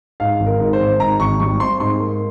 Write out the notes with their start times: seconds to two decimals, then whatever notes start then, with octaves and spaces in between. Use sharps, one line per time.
0.20 G#2 F5
0.40 G#1
0.46 A#4
0.60 G#2
0.73 C5
0.80 G#1
1.00 G#2 A#5
1.20 G#1 C#6
1.40 G3 C#6
1.60 C4 C6
1.80 G#2 C6
2.00 A#3